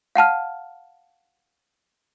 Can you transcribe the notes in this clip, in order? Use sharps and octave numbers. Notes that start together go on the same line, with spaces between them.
F5 F#5 A5 F6